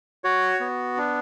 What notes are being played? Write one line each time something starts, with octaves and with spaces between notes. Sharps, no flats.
F#4 C#5
B3
D4